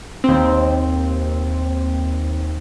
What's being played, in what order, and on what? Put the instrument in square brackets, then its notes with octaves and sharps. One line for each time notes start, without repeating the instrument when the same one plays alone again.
[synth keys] D#2 C4